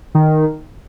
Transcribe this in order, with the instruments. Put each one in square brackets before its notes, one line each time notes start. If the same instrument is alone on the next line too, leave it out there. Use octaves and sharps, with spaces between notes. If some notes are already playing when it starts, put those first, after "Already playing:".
[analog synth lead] D#3